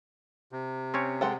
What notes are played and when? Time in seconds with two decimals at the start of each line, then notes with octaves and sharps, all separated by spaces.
0.52 C3
0.94 C4 C#4 C#5
1.21 G#3 A4 F#5 G5